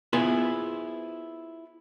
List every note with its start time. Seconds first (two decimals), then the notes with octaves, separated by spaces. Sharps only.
0.13 B3 E4 F4 G#4 B4 C5